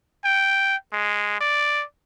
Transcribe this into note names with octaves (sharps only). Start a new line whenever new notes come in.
G5
G#3
D5